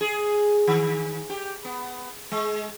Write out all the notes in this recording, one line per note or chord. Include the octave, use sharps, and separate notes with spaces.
G#4
D#3
G4
B3
G#3